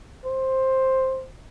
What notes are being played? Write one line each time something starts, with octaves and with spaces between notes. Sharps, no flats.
C5